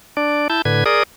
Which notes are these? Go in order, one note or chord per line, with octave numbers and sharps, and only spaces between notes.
D4 D5
E4 A5 G6
A2 D3 B4 G#6
G#4 A#4 D5 D#6